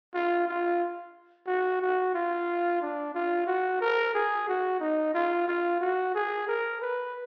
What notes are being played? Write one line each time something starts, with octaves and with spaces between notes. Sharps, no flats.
F4
F4
F#4
F#4
F4
D4
F4
F#4
A#4
G#4
F#4
D#4
F4
F4
F#4
G#4
A#4
B4